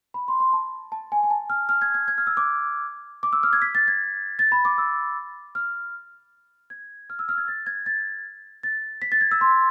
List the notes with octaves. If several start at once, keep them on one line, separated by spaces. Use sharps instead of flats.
B5
C6
C6
A5
A5
G#5
G#5
A5
F6
F6
G#6
G#6
G#6
F6
E6
D6
D6
E6
F6
G#6
B6
A6
G#6
A6
B5
D6
E6
F6
G#6
F6
E6
F6
G#6
A6
G#6
A6
A6
B6
A6
G#6
E6
C6